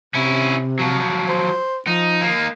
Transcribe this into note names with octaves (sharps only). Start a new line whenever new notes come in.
C3 C#4 E4
F3 F#3
C5
F3 D#4
A#3 D#4